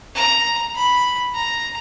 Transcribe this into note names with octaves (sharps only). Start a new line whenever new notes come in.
A#5
B5
A#5